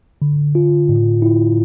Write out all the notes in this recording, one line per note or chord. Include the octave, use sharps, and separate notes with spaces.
D3
F4
A2
E4